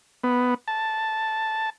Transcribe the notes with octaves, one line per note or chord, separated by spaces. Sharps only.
B3
A5